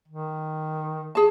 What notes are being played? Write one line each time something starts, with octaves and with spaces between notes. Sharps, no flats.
D#3
G#4 A5